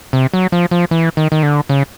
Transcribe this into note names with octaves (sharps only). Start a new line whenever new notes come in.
C3
F#3
F3
F3
E3
D#3
D#3
D3
C#3